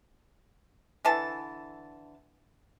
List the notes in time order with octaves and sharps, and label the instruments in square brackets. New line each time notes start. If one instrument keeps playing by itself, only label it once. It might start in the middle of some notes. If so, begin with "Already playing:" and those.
[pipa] D3 E3 A5